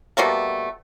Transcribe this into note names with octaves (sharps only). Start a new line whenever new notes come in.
B2 G3 A3 A#3